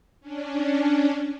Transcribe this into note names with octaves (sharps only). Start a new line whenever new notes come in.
C#4 D4